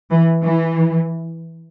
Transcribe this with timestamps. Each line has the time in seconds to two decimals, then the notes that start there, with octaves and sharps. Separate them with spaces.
0.11 E3
0.44 E3